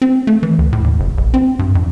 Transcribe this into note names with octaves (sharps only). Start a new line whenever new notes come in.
C4
A3
E3
D2
A2
D#2
F#1
A#1
C4
G2
F2